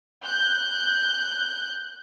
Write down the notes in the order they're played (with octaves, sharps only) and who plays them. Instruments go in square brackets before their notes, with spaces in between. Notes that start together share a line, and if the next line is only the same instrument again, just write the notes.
[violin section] F#6 G6